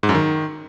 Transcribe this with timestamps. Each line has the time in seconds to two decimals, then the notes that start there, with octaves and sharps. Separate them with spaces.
0.03 G#2
0.09 F#2
0.15 D#3